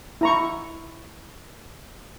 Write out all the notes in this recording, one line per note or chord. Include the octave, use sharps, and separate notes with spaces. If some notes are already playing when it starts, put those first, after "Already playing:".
E4 A#5 C#6